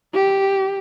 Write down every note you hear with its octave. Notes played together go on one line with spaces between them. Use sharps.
G4